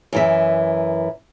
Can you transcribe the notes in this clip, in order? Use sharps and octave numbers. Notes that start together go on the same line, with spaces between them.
F#2 E3 E5